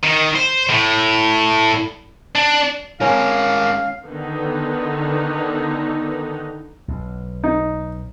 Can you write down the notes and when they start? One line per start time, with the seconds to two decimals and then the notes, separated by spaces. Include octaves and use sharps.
0.04 D#3
0.35 C5
0.70 A2
2.35 D4
3.01 G#3 C#4 A#4 F5
4.07 D3 D#3 B3 D#4
6.88 B1
7.44 D#4